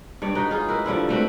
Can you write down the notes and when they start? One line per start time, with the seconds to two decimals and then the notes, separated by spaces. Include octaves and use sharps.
0.22 G2 C#5 D5
0.35 D#4 F#4 B4 C#5
0.51 D#4 F4 G#4
0.68 E4 F#4 A#4 B4
0.86 D3 F3 G3 E4
1.09 A3 C4 F#4 B4